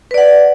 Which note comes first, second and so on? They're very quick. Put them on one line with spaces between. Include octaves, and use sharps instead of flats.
B4 D5 F#5